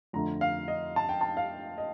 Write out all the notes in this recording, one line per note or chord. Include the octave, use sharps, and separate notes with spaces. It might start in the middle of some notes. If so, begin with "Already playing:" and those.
F2 D3 F3 A3 A#5
F5
D#5
A5
G5
A5
F5
D#5